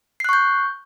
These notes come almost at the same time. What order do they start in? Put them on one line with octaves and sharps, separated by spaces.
C7 F#6 C#6 G6